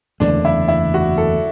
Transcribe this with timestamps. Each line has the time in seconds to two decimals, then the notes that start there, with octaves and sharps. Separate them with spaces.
0.20 F#1 E2 D3 A3 D4
0.45 E4
0.68 E4
0.94 F#4
1.18 A4